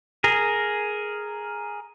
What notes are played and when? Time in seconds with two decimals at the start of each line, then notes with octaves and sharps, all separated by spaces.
0.24 G#4 A#4